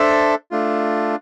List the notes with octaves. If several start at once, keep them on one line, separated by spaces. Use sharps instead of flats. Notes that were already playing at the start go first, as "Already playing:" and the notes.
Already playing: D4 A4 C5 E5
A3 D4 F4